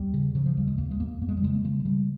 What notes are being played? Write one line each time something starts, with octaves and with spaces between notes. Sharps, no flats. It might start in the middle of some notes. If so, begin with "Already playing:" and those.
Already playing: D#2 G3
C#3
C#3 F3
F3
D#2 G3
G#3
D#2 A#3
G#3
D#2 A#3
F2 A#3
G#3
G3
C#3 G#3
A#3
C#3 G#3
G#3
C#3 G3